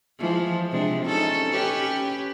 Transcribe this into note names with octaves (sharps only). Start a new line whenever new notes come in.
E3 F3 G#3
C3 G#3 D4
C#4 D#4 A4
C#4 G4 B4